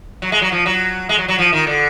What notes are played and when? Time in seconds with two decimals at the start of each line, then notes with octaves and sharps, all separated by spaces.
0.22 F#3
0.32 G#3
0.42 F#3
0.52 F3
0.66 F#3
1.09 G#3
1.18 F#3
1.28 F#3
1.38 F3
1.53 D#3
1.67 D3